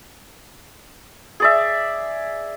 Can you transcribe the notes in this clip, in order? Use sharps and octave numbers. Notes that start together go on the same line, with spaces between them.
G#4 D5 E5